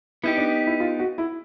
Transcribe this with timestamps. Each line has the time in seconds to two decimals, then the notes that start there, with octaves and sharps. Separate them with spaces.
0.23 B3 D#4 E4 G4
0.37 D4
0.67 E4
0.80 F4
0.99 F#4
1.18 E4